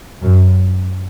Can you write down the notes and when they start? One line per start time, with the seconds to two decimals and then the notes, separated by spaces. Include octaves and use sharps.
0.24 F#2